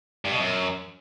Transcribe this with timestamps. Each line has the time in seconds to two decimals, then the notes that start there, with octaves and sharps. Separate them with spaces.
0.25 G2
0.32 B2
0.39 F#2